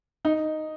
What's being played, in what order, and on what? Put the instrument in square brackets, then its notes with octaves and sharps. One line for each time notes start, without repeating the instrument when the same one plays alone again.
[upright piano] D#4